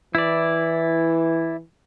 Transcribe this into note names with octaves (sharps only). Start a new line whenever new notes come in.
E3 E4 D5